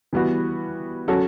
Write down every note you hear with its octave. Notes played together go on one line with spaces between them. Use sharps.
E3 G3 B3 F#4
F#3 C#4 F#4 A4